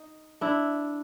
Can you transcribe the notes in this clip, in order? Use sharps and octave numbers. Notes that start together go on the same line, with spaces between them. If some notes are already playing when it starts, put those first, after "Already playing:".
Already playing: D#4
D4 E4